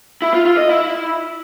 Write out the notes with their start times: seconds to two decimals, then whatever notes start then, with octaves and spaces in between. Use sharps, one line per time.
0.22 E4
0.34 F4
0.46 F4
0.57 D#5
0.69 E4